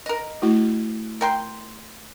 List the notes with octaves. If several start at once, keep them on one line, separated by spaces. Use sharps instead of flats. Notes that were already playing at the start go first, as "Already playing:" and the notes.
A#4 D#5
A3 E4 F#4
A#4 G5 C6